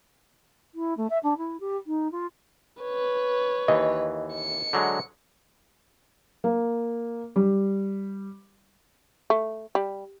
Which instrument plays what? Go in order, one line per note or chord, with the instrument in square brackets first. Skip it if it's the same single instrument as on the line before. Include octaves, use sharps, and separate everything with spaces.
[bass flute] E4
A3
E5
D4
E4
G4
D#4
F4
[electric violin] B4 C#5
[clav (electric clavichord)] D#2 E3 [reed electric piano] D#5
[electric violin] C#7
[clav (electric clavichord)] D3 F#3 G#3
[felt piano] A#3
G3
[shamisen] A3
G3